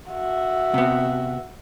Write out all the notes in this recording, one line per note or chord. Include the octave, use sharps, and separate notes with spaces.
F#4 E5
C3 B3